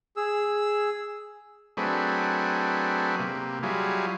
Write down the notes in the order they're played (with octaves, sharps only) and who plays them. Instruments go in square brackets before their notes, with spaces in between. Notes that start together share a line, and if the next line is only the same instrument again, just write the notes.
[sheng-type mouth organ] G#4 E6
[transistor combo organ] F#3 A3 C4 D4 G#4 B4
C3 A#3
F#3 G3 E4 F4 G#4